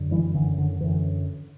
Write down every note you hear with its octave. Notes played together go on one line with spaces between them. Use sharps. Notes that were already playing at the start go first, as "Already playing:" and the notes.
Already playing: F#2 D3
E3 G3
F#2 D3 E3
D3
F#2 D3 E3